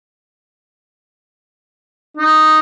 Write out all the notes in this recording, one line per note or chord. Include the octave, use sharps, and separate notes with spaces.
D#4